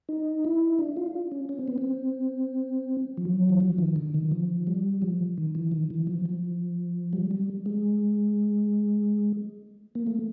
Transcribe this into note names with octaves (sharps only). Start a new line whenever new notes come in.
D#4
E4
D4
F4
C#4
C#4
C4
B3
C4
F3
F#3
E3
F3
D#3
D3
D#3
F3
G3
F3
D#3
E3
D#3
E3
F3
F3
G3
G3
G#3
A#3
A3